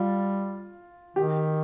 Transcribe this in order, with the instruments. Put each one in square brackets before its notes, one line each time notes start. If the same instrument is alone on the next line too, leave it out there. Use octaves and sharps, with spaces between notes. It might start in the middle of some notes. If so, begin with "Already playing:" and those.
Already playing: [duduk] G3 [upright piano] F4
[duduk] D#3 [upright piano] G4